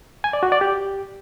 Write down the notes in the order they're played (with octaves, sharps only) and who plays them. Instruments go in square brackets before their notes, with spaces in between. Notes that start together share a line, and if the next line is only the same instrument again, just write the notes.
[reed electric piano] G#5
D5
F#4
D5
G4